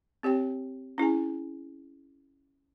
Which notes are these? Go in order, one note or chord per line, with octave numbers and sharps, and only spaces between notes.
C4 G4 C#5 G5
C#4 E4 G#4 G#5